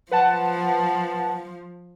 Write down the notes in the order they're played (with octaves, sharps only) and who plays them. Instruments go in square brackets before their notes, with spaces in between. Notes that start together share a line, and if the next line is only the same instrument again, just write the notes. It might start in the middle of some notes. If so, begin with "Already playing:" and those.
[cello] F3 [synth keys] B4 F#5 A5